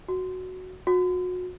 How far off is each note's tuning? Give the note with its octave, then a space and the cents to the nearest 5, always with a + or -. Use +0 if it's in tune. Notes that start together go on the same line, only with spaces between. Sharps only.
F#4 +0
F#4 -30